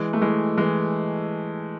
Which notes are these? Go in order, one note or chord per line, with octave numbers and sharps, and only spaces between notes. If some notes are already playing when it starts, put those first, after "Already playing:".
Already playing: E3 G#3
A3
E3 G#3
E3 G#3